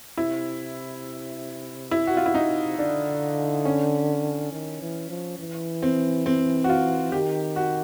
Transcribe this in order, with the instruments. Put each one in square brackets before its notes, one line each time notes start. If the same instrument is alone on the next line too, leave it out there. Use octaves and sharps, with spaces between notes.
[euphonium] C3 [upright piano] E4
[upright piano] E4
F#4
F4
E4
D#4
[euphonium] D3 [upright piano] D4
[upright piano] C#4
[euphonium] D#3
E3
F3
E3
[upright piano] C4
C4
F#4
F4
[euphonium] D#3 [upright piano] G4
[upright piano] F#4